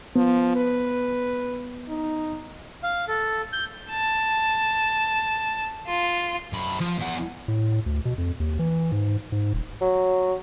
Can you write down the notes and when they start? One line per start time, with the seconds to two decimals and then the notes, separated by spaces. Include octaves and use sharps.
0.16 F3 B3
0.56 B4
1.89 D#4
2.83 F5
3.08 A4
3.53 G6
3.90 A5
5.87 F4
6.53 F#2 B5
6.81 F3
6.99 E2 F#5
7.48 A2
7.86 D2
8.05 B2
8.18 F2
8.40 D#2
8.59 E3
8.92 G#2
9.32 G#2
9.53 D#1
9.81 F#3